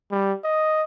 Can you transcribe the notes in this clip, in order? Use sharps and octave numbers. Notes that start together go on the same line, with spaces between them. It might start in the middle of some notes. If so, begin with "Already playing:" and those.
G3
D#5